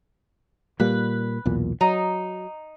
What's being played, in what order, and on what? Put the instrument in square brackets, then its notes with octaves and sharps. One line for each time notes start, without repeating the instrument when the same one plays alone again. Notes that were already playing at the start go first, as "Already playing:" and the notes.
[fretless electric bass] A#2 G3 A#3 [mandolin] B4
[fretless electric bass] B1 E2 A#2
[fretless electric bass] F#3 [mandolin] D#4